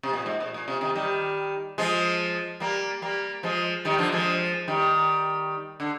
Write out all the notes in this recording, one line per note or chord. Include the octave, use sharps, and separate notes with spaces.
C3
A#2
G#2
A#2
A#2
C3
C3 D#3
D#3 G3
F3 G#3
G3 A#3
G3 A#3
F3 G#3
D#3 G3
D3 F3
F3 G#3
D#3 G3
D3